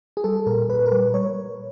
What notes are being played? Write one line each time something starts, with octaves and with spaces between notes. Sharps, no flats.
G#4
G3 A4
A#2 A#4
A#2 B4
A#4
G3 B4
G3 C#5